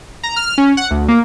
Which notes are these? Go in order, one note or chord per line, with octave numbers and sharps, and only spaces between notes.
A#5
F6
C#4
F#5
D2
A#3